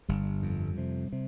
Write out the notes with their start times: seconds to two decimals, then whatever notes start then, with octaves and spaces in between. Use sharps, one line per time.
0.09 G1 G3
0.43 F2
0.78 C3
1.13 C3